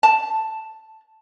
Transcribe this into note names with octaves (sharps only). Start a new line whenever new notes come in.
A5